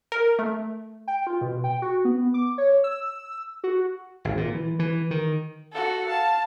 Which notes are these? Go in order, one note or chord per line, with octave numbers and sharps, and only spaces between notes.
A#4
A3
G5
F4
B2
G5
F#4
B3
D6
C#5
E6
F#4
G#1
A#2
E3
E3
D#3
F#4 A4
F5 A5